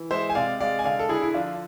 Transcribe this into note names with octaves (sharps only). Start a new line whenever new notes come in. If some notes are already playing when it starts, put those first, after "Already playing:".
Already playing: E3
G#3 C5 E5
G#5
C3 D5 F5
G#3 D5 F5
G#5
D3 D5 F5
A4
D3 E4 G#4
E4
F3 D4 F4